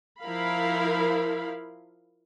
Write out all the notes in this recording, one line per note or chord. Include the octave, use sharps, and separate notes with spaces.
F3 E4 A#4 F5 B5